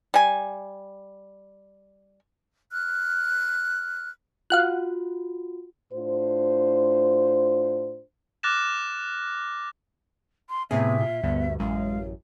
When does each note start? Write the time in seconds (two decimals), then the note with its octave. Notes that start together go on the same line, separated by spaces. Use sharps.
0.14 G3 G#5
2.72 F6 F#6
4.50 F4 F#4 F5 F#5 F#6
5.93 A2 D4 F4 C5
8.43 D6 F6 F#6 A6 A#6 E7
10.49 C6
10.71 A2 C3 B3 C#4 G#4 E5
10.99 A#2 F4
11.23 D2 G2 A3 B3
11.60 A1 F#2 G#3 F5